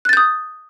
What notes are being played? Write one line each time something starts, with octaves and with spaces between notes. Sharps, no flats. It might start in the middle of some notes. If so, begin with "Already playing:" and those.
D#6 F#6 G6 A6